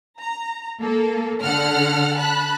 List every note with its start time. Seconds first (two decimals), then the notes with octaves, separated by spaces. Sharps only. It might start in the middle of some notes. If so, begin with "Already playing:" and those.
0.19 A#5
0.80 A#3 A4
1.43 D3 A4 F#5 F6
2.16 A5 B5 F#6